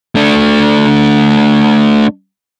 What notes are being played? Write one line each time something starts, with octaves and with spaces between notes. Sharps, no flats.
A3 D4